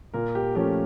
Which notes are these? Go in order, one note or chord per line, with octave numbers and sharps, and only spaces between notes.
A#2 A#4
G4
F3 A3 C#4 G4